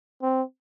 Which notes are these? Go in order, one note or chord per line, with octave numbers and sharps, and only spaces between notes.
C4